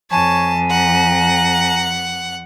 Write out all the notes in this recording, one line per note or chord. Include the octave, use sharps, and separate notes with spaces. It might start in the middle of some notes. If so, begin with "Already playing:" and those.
F2 C#5 G#5 A5
F#5 A#5